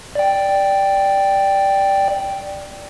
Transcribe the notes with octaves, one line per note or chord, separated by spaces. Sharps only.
D5 G5